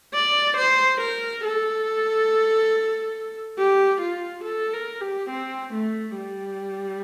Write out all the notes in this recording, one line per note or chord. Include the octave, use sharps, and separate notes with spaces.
D5
C5
A#4
A4
G4
F4
A4
A#4
G4
C4
A3
G3